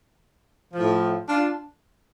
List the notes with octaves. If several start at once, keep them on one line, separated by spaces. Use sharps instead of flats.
A2 F3
D4 F4